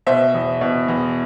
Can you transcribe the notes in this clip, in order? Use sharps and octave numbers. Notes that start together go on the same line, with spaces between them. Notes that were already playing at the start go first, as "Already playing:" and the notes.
B2 C5 E5
E2
B2
E2